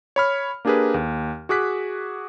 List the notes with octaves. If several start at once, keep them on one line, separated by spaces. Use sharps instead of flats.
C#5 B5 F6
A#3 D4 G4 G#4 A#4 B4
D#2
F#4 G#4 D6 F#6 B6